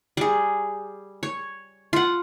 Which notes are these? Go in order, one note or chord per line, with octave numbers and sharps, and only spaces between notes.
G3 G#4
C#5
F4 F#5